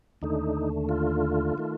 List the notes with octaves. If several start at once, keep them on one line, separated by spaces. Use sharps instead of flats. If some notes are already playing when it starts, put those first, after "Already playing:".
D#2 D3 A3 D#4
F4
D#3 A3